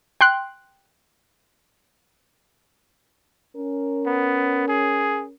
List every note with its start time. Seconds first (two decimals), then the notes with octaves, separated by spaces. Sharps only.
0.21 G5 C6 F#6
3.57 C#4 A#4
4.06 B3
4.68 G#4